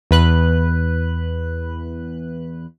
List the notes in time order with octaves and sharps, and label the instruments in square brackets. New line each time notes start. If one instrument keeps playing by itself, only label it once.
[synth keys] E2 B4 F#6